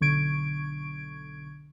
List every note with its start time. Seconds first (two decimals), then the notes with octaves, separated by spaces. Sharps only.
0.01 B1 D3 C#6 G#6 D7